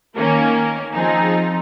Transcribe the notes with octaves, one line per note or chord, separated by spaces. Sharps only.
D#3 A#3 C#4 A#4
F3 C4 D#4 G#4